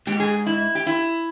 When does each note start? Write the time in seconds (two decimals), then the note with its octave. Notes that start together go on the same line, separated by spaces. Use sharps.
0.07 G#2 G4
0.20 G#4
0.46 E4
0.75 G4
0.87 E4